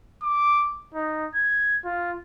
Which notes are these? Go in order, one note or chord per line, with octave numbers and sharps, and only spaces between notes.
D6
D#4
G#6
F4